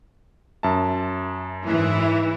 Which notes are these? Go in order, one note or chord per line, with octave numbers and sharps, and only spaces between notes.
F#2 E5 A5
G#2 E3 E4